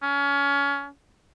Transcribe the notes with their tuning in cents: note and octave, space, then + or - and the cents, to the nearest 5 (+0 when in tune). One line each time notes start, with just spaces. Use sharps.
C#4 +25